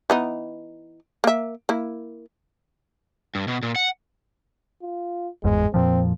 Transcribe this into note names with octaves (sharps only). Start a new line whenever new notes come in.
E3 B3 D#4
A#3 E5
A#3 E4
G2
B2
A#2
F#5
F4
G1 E2 G#2 G#3
F2 A#2 F3 C4